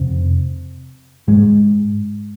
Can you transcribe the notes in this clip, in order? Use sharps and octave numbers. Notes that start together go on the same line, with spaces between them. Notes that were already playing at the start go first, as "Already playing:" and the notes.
Already playing: F2 C3 C4
G#2 G#3